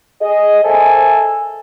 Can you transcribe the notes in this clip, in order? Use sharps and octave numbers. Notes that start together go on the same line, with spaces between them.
G#4 D#5
A4 A#4 C5 E5 G#5